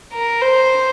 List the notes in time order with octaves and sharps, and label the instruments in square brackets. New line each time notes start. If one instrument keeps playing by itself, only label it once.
[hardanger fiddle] A#4
C5